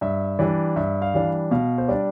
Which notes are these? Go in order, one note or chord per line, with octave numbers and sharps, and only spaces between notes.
G2 E5
E3 G3 D4 D5
G2 E5
F5
E3 G3 D4
B2 F5
C5
G3 D4 D5